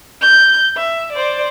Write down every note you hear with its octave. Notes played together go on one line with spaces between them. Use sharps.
G6
E5
C5 D5